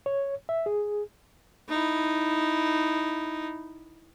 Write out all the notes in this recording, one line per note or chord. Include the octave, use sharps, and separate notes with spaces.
C#5
E5
G#4
D#4 E4